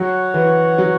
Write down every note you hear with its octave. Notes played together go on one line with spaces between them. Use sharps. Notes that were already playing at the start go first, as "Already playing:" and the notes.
Already playing: F#3 F#4 C#5 F#5
E3
F#3